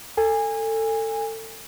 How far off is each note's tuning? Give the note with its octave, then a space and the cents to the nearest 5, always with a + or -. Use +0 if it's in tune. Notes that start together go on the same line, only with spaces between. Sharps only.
A4 +20 G#5 -25